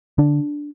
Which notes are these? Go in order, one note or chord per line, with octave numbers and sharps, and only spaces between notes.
D3 D4